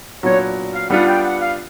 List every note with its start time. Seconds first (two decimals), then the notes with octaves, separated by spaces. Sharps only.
0.23 A#2 F#3 B3 D4 C#5
0.74 F5
0.90 G3 B3 D4 F4 F#5
1.06 G5
1.24 F#5
1.39 F5